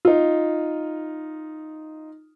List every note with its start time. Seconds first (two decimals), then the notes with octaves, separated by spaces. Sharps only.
0.05 D#4 F4